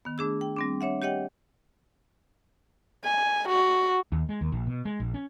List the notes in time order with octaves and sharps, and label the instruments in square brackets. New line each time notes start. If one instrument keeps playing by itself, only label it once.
[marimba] D#3 B3
A3 D4 G#4 E6
G5
G3 C4 D4
D4 C#5 E5 F#5
G4 C#5 D#5 F#5 G5
[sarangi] G#5
F#4
[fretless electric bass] D#2
G#3
D#2
A#1
B2
G#3
A#1
C#4